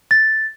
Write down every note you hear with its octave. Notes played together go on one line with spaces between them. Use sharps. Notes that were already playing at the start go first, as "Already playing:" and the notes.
A6